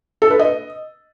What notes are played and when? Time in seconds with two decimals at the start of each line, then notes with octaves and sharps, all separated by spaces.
0.22 A4
0.31 B4
0.39 D#5